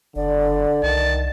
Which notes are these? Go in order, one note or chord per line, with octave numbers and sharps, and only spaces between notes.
F#1 D3 D5
C2 D#3 A5